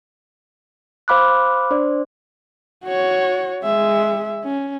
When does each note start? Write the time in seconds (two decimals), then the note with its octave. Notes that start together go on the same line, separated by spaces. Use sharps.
1.08 C5 F5 B5 D6 F6 F#6
1.71 D4 C5 D5
2.84 F#4 C#5
3.63 G#3 E5
4.44 C#4